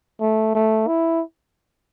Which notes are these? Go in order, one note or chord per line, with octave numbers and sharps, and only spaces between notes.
A3
A3
E4